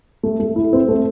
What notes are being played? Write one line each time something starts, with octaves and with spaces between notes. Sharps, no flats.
A3
A3
E4
C4
A3